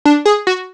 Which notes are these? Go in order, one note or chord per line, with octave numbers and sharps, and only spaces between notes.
D4
G#4
F#4